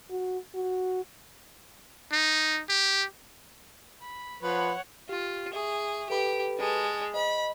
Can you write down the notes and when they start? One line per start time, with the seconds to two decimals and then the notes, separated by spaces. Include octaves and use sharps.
0.10 F#4
0.55 F#4
2.12 D#4
2.69 G4
4.02 B5
4.43 F3 B4 C#5 F#5
5.09 F4 G4
5.53 G#4 E5 C#6
6.10 G4 A4 B4 B5
6.59 G#3 A5
7.14 C5 D#5 B5